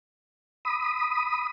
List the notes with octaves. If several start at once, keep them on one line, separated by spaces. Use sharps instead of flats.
B5 D#6